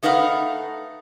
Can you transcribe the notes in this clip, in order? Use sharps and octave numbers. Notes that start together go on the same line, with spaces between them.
A3 D#4 B4 F5 F#5